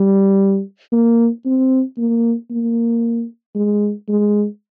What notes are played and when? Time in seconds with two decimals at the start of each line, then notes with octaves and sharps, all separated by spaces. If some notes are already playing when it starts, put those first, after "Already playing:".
Already playing: G3
0.92 A#3
1.45 C4
1.98 A#3
2.50 A#3
3.55 G#3
4.09 G#3